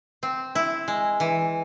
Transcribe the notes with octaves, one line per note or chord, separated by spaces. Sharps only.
C4
E4
G#3
E3